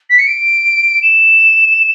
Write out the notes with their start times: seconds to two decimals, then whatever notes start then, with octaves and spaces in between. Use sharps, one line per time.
0.10 B6
0.19 C#7
0.27 D7
1.02 E7